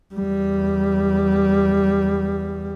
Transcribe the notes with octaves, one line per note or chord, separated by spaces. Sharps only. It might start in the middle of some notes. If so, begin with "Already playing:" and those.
E2 G3